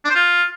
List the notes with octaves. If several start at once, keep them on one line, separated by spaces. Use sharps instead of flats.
D4
C5
F4